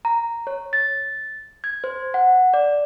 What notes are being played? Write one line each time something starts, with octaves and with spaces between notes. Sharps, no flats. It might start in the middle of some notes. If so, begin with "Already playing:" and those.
A#5
C#5
A6
G#6
C5
F#5
D5